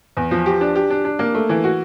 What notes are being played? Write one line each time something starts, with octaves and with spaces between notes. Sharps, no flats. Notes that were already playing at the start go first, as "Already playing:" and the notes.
E2
F3
G4
D4
G4
D4
D4
A#3
A3
E3
F#4